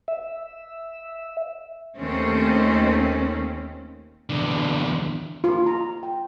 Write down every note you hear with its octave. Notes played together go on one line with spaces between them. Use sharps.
E5
D#2 D#3 A3 C4 C#4
E2 D3
F4
A#5
G5